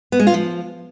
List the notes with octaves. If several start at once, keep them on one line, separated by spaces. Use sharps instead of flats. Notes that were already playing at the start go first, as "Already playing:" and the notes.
B3
G#3
F4
F3